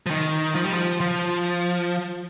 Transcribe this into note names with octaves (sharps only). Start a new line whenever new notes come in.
F3
D#3
F3
G3
F3
F3